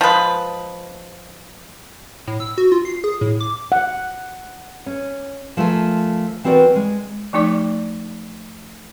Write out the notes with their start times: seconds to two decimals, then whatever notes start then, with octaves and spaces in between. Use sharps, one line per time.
0.01 F3 G#3 B4
2.27 A2
2.40 E6
2.58 F#4
2.72 F4
2.85 C7
3.04 G#4
3.21 A2
3.41 D6
3.72 F#5
4.86 C#4
5.57 F3 A3 F4 A#4 G#5
6.44 E3 C4 F#4 A#4 D5
6.76 G#3
7.33 F3 A3 D#4 D5 D6